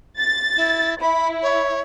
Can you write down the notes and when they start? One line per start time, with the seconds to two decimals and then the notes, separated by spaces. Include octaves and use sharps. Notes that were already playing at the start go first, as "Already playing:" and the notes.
0.19 A6
0.57 E4
1.01 E4 B5
1.42 C#5